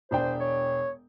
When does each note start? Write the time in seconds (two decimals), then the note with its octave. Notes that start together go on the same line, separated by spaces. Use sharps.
0.11 E1 D4 C5 G5
0.40 C#5